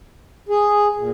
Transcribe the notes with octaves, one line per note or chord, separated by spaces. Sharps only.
G#4
A#2